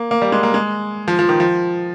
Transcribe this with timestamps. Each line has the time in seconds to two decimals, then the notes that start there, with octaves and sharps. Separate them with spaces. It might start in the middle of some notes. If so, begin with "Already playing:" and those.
Already playing: A#3
0.11 A#3
0.22 G3
0.32 G#3
0.43 A#3
0.54 G#3
1.08 F3
1.19 F3
1.29 D#3
1.40 F3